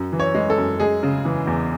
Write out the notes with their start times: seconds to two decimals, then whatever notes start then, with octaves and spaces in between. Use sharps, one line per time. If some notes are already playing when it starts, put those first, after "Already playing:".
Already playing: F#2
0.13 E3
0.20 C#5
0.35 G#3
0.50 A4
0.58 F#2
0.80 G#3 G#4
1.03 C#3
1.25 E3
1.47 E2